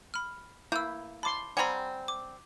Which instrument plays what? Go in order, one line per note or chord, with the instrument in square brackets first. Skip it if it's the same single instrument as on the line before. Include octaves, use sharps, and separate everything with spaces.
[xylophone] B5 F6
[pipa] A#3 [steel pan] E4 [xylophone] E6 G6
[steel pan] A5 C6 [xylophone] B5 D6
[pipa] G3 C4 [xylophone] F#5 A#5 B5 [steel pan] G#5
[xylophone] D6